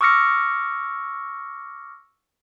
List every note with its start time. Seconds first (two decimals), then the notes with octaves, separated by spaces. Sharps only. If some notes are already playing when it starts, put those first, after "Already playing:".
0.01 C#6 D6 E6 F6 A#6 C#7